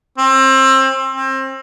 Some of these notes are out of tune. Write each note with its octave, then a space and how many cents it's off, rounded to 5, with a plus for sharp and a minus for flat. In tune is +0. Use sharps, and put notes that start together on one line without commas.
C4 +30
C4 +30